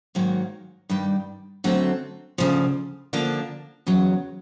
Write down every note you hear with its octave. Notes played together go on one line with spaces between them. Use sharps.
G#2 D#3 F#3 A#3
G2 D#3 G3
D3 F#3 A3 C4
D2 C#3 F3
D3 F3 A#3 D4
E2 C#3 F#3